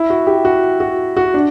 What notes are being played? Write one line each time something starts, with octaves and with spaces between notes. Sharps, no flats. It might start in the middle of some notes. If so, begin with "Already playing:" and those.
Already playing: E4
F#4
G4
F#4
F#4
F#4
D4